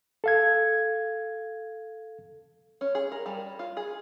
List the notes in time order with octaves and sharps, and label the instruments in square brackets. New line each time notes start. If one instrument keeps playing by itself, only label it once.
[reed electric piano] A4 F5 G#6
[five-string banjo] C#4
G#4
A#4
G3
F4
G#4